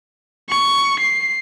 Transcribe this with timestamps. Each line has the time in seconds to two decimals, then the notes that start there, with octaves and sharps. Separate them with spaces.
0.49 C#6
0.99 C7